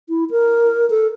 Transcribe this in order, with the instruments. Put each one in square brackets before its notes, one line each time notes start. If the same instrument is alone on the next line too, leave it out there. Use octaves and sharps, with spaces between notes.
[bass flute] E4
A#4
A4